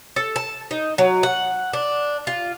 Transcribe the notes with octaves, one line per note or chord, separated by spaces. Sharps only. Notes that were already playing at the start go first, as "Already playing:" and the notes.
A4
A5
D#4
F#3
F#5
D4
F4